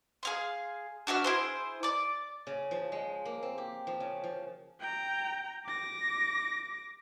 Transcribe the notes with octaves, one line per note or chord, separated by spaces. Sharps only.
G#4 F5 C6
D4 F#4 E5 F6
E4 G#4 C5
D5 D6
C#3
F3
G#3
A#3
C4
G4
F3
C#3
F3
G5 A#5
D6 A#6